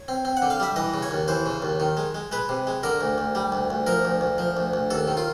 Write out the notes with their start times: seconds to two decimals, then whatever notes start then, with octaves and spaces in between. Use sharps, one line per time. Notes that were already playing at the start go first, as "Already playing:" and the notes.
Already playing: C#5
0.08 C4
0.25 C4
0.37 F#5
0.42 D3
0.50 F5
0.60 G3 E5
0.76 E3 D#5
0.94 C#3
1.03 C#5
1.11 D#2
1.28 E3 C5
1.46 C#3
1.62 D#2
1.80 D#3
1.97 G#3
2.15 G#3
2.32 G#3 B4
2.49 C3
2.67 G#3
2.83 D3 A#4
3.01 D2
3.18 D2
3.35 G3
3.52 D2
3.70 D2
3.87 F3 A#4
4.05 D2
4.21 D2
4.38 F3
4.57 D2
4.73 D2
4.90 D#2 A4
5.08 D#3
5.17 F4